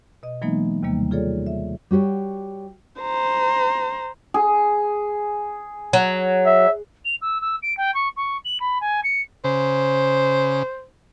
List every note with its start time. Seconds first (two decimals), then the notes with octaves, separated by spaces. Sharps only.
0.23 B2 D#5
0.42 E3 F#3 G#3 A#3 B3 D#4
0.83 D#2 C3 D#3 G3 A#3
1.11 F4 G#4 A4 C#5 D5
1.46 E5
1.91 G3 F#4 G4 C#5
3.02 C5 A#5
4.34 G#4
5.93 F#3
6.46 E5
7.05 F7
7.21 E6
7.41 E6
7.62 D7
7.77 G5
7.94 C#6
8.16 C#6
8.45 F#7
8.60 B5
8.81 G#5
9.04 C#7
9.44 C#3 C5